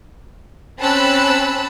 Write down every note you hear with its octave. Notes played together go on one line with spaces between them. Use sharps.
C4 C#4 A5 B5 E6 F#6